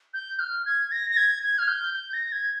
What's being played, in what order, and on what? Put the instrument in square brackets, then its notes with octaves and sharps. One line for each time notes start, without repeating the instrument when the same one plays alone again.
[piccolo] G6
F6
G#6
A#6
A#6
G#6
G#6
F6
G6
G6
A#6
G#6